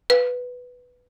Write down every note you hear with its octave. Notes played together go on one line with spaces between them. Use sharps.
B4